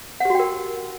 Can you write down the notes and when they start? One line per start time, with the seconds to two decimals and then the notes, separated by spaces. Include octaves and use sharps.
0.20 F#5
0.25 G4
0.30 F#4
0.35 G5
0.40 A#4